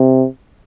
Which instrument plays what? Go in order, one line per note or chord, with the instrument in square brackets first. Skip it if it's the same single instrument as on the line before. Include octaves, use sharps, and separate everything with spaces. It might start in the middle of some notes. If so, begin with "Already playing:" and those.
Already playing: [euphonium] C3